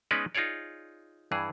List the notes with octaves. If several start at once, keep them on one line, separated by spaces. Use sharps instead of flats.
G#3 B3 C#4 D#4 B4 D5
D#4 F4 G#4 C#5 D5
G2 E3 G#4